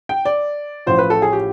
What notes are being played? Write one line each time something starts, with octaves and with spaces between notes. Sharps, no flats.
G5
D5
A1 A2 F3 C5
B4
A4
G#4
G4